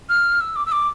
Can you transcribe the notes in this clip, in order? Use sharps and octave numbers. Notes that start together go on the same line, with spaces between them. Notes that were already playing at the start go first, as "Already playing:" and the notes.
F6
E6
D6
E6
D6